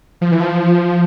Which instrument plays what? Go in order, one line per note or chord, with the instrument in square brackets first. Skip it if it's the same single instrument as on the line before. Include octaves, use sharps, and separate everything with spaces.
[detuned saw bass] F3
E3
F3